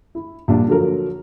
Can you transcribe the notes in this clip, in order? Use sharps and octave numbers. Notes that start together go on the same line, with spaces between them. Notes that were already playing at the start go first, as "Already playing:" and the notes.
E4
A#1 G3 A#3 D4
D3 F3 F#3 A4 A#4